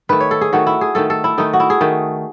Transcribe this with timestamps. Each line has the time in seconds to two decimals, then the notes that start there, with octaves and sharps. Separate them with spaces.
0.09 D#3 A3 B4
0.20 C#5
0.31 A4
0.41 G#4
0.53 D#3 A3 F#4
0.67 E4
0.81 G#4
0.95 D#3 A3 A4
1.10 A4
1.24 E4
1.38 D#3 A3 D#4
1.53 F#4
1.60 E4
1.70 G#4
1.81 D#3 A3